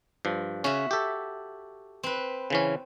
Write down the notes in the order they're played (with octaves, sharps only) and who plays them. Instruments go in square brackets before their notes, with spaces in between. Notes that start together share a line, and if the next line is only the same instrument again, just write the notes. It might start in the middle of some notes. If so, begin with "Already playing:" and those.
[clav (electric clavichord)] G2 F3
[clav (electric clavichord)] C#3 C#4 [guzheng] F#4 E5
[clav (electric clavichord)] G4 A4
[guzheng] C4 B4
[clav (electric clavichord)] C#3 E3 C#4